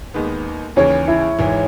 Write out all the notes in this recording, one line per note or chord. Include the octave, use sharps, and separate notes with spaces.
D#2 D#3 G#3 B3
D#2 C#3 E3 C#5
E4
G#1 G#2 E3